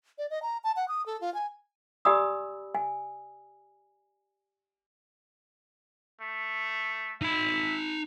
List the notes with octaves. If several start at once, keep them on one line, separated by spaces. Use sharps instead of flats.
D5
D#5
A#5
A5
F#5
D#6
A4
F4
G#5
G4 D5 G#5 B5 D#6 E6
G#5
A3
D#4 E5 B5